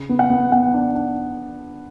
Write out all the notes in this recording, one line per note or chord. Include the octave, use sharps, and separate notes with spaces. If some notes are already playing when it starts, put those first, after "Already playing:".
Already playing: C#3
B3
F#5
B3
B3 F#5
D4
D4